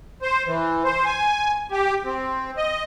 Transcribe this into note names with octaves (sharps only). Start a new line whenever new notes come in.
C5
E3
C5
G#5
G4
C4
D#5